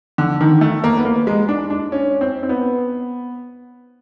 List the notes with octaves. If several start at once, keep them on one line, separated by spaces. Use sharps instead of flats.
D3
D#3
A3
A#3
B3
A#3
G#3
D4
D4
C#4
C4
C4
B3